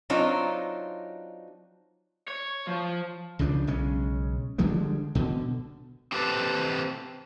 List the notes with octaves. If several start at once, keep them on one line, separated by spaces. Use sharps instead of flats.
F#3 C4 D4 D#4 F4 C#5
C#5
F3
C#2 C#3 F3 D4
B1 C#3 G#3 C#4
D3 F3 G3 G#3
B2 D3
C4 G4 A4 B4 C5